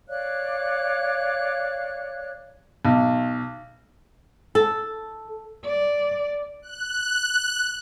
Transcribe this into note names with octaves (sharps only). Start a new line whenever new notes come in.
C#5 D5 F5 F#6
B1
A4
D5
F#6